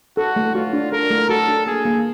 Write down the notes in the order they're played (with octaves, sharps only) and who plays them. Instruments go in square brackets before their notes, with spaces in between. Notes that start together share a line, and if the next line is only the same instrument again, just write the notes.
[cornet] F#4 [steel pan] A4
[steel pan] A3
[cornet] F4 [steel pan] F#4
[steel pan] D4
[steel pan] A4 [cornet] A#4
[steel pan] A3
[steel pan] F#4 [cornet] A4
[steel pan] D4
[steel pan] A#3 [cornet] G#4
[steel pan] A#3